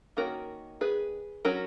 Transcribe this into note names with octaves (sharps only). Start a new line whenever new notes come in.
D#3 A#3 C#4 F#4 A#4
G#4 B4
F#3 C#4 F#4 A#4